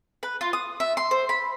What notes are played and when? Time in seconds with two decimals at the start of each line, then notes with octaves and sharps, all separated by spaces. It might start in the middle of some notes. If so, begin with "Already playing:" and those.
0.23 B4
0.41 F4
0.53 D#6
0.80 E5
0.97 C6
1.11 C5
1.29 B5